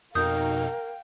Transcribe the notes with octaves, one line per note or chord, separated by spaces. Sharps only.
F2 B2 D#4 A#4 F5 G5 D#6 G6